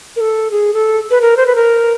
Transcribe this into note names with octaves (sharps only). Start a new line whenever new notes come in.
A#4
A4
G#4
A4
B4
A#4
C5
B4
A#4